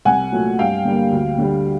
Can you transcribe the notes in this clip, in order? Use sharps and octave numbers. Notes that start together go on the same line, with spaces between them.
C2 F#5 G#5
A#2 F#3 A3
G2 F5 G5
D3 G3 A#3
D2
D3 G3